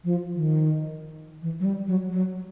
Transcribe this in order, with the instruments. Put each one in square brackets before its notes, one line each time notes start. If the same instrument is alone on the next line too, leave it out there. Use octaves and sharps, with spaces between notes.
[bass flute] F3
E3
D#3
E3
F#3
G3
F#3
F#3